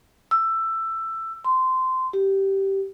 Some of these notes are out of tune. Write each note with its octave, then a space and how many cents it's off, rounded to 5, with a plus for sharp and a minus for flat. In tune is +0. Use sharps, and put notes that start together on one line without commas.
E6 +15
C6 -15
G4 -10